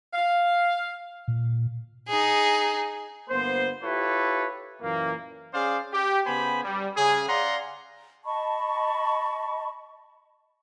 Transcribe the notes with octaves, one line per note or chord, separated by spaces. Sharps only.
F5
A#2
D#4 G#4
G1 A#3 B3 C5
E4 F4 G4 A4 B4 C#5
F#2 A#2 E3 A#3
C#4 G#4 C5 D5 F5
G4
C#3 B3 C5 G#5 B5
G3
C#3 G#4
D5 F5 F#5 A#5 C6
D#5 A5 B5 C#6